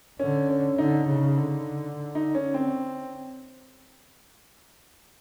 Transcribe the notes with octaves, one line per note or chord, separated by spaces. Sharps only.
D3 C#4
C#4
D3 D#4
C#3
D3
D#4
C#4
C4